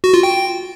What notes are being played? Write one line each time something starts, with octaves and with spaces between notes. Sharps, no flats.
F#4
F4
G5